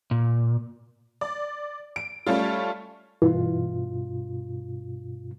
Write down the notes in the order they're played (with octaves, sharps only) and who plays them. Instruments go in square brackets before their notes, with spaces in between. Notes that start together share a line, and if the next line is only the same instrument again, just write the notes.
[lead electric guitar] A#2
[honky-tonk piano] D5
D7
G3 A3 C#4 F4
[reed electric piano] G2 B2 F4 [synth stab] E3